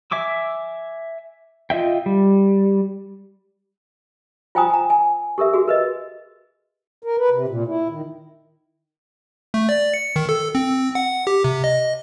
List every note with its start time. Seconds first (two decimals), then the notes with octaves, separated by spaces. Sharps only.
0.11 E5 G#5 D6 E6
1.70 F4 D#5 E5 G5
2.06 G3
4.55 F4 C5 G5 G#5 A#5 D#6
4.70 G#5 A#5
4.90 G#5
5.38 G4 A4 A#4 E5
5.53 F#4 G#4
5.68 A#4 B4 D#5
7.04 A#4
7.18 B4
7.31 C3
7.48 A#2
7.67 E4
7.89 D#3
9.54 A3
9.69 D5
9.94 C#7
10.16 D#3
10.29 A4
10.55 C4
10.95 F#5
11.27 G4
11.44 C3
11.64 D#5